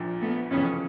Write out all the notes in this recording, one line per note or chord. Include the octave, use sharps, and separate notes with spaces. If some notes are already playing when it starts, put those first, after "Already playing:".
Already playing: A#1 A#2 F3
A3 B3
F1 F2 C#3 E3 B3 C#4